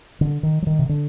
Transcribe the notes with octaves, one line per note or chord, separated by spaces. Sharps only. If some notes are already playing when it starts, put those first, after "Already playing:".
D3
D#3
F#3
D#3
C3
D3